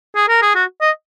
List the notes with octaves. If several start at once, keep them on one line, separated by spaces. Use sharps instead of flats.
G#4
A#4
G#4
F#4
D#5